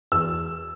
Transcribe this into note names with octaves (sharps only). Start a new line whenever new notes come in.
E2 E6